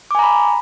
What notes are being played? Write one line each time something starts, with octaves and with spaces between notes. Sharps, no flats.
G#5 A#5 B5 D6